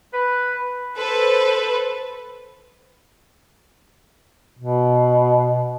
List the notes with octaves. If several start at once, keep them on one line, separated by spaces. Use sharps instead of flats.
B4
A4 B4 C5
B2